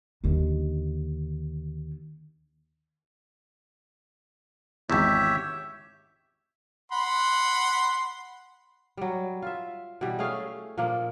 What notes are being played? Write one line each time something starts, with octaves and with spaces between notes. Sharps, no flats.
D#2 D3
G#1 E2 G4 C#5 E5
F#5 B5 C6
F#3 G3
F4 E5
B2 E3 G3
A3 C#4 G#4 F5
A#2 F3 A#3 D4